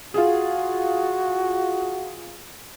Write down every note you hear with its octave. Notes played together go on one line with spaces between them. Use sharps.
F4 F#4 G#4